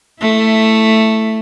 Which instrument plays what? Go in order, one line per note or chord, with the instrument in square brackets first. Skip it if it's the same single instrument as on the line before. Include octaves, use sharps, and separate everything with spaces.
[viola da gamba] A3 E4